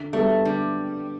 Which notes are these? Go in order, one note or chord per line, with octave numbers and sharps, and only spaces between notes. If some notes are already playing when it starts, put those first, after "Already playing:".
Already playing: D3
G3 A3 B3 F#4 A4
D3 G3